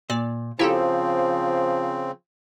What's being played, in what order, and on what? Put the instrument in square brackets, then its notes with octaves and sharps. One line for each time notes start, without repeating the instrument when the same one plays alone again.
[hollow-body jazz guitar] A#2 [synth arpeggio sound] D5
[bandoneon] C#3 C4 [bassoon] F3 [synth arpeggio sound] E4 G4 A4 [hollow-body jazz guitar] A#5